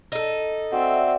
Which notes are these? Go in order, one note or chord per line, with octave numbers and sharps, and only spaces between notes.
D#4 A4
C4 F#4 D5 E5